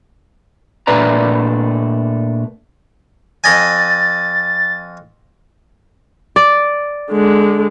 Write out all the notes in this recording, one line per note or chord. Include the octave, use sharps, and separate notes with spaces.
A#2 A3 D4 B4 D5 A#5
F2 D#5 G#5 A6
D5
D3 G#3